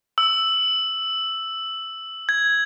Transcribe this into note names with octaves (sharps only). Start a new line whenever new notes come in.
E6
G#6